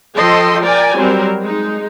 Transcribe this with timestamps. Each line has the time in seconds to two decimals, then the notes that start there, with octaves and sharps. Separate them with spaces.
0.16 F3 A4 D#5 G5 C6
0.62 A#4 D5 G5 G#5
0.95 F#3 G3 C4 A#4
1.41 G#3 D#4